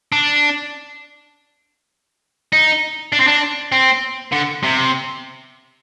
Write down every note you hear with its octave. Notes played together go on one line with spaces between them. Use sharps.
D4
D#4
D4
C4
D4
C4
D3
C3